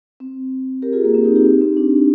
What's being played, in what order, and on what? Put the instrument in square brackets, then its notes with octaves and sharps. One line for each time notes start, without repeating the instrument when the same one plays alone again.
[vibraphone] C4
G4 A#4
F4 G#4
A#3
C4
D#4 G4
D#4 G4
D#4
C4
D4